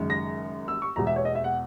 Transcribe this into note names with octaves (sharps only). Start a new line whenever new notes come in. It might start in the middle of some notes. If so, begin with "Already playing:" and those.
Already playing: F#1 F#2 D#3 G#3
A#6
E6
C#6
E2 B2 G#3 A#5
E5
C#5
D#5
E5
F#5